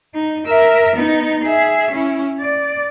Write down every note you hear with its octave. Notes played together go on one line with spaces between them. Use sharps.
D#4
A#4 E5
B3 D#4
G#4 E5
C#4 E4
D5